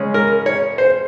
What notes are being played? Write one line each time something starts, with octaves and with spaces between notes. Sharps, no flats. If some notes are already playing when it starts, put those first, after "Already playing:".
Already playing: C#3 G#3 C#4
A#4
C#5
C5